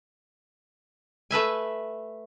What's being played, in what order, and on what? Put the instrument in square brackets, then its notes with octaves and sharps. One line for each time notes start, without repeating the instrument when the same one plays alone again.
[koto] A3 B4 E5 G#5